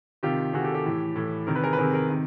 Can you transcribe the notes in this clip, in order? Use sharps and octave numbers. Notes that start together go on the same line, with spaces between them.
C3 D#3 F4 G4
C3 D#3 F#4 G#4
G4 A4
G4 A4
A2 E3
A2 E3
C3 D#3 A#4
B4
G#4 A#4
B4
C3 D#3 G#4 A#4
G#4 A#4
C3 D#3